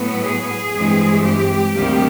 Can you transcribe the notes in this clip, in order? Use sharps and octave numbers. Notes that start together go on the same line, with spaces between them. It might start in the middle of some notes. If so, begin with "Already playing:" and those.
Already playing: A2 F#3 B3
G#4
G2 E3 G#3 C4
G4
D2 C3 D#3 G3 A#3